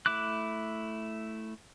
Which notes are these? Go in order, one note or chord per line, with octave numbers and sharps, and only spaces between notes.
A3 E4 D6 F#6